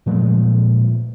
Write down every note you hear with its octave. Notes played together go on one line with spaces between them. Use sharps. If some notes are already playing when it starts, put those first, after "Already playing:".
A#2 F3 G#3 A3